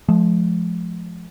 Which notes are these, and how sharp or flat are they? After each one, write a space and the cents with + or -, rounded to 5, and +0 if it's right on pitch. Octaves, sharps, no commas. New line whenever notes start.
F3 +0 G#3 +45